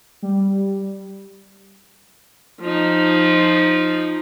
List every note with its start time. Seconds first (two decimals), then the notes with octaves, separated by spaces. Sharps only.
0.22 G3
2.62 F3 D#4